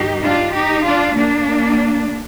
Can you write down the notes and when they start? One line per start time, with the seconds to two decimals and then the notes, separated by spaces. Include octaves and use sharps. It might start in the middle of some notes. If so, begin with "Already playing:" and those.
Already playing: G2 D#3 D#4 G4
0.23 D4 F4
0.55 D#4 G4
0.86 D4 F4
1.17 A#3 D4